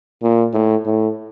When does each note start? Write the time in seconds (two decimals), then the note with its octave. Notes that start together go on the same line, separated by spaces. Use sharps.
0.23 A#2
0.54 A2
0.86 A2